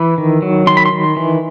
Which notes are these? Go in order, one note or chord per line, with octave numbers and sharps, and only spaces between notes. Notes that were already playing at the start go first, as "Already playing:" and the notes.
Already playing: E3 B5
D#3
F#3
D#3 C6
B5
C6
D#3
E3